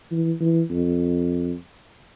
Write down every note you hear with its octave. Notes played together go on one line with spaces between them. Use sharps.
E3
E3
F2